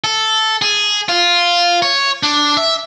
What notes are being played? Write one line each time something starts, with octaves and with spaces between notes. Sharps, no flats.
A4
G#4
F4
C#5
D4
E5